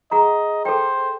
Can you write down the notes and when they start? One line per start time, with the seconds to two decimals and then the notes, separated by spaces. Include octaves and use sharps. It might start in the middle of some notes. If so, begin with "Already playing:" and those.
0.11 G#4 D#5 F#5 A#5
0.65 A4 C5 G5